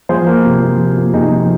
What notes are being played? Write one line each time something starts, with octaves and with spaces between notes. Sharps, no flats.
F3 G#4 C5
A#3
C3
F3
C3
A#3
C3 D#4 G#4
F3